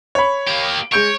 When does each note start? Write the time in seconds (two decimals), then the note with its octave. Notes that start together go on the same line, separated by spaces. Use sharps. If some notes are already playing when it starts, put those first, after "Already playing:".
0.15 C#5 B5
0.47 A#3 G4
0.92 G#3 C#5 G6 D7